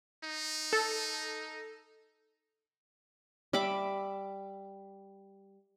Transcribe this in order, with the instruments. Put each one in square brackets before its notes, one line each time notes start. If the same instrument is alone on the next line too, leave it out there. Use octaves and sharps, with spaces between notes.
[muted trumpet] D#4
[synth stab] A4
[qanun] G3 E5 B5 D6